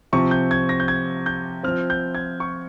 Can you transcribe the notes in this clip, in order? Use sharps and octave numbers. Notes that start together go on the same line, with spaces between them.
C3 F3 C4 C#6
G6
G#6
A#6
G6
G#6
G6
F3 C4 F6
G6
G#6
C#6